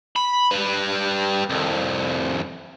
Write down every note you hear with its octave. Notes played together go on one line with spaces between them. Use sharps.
B5
G3 B4
C2 F2